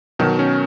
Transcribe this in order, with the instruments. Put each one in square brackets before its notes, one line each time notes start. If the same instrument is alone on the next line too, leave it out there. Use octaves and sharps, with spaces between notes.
[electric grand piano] B2 [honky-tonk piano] D#3 F#3
[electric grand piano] C#4